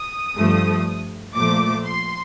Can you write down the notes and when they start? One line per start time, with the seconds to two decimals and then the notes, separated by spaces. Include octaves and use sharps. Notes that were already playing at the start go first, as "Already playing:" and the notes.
Already playing: D#6
0.36 G2 F3 A3
1.36 A#2 F3 A3 D6
1.85 C6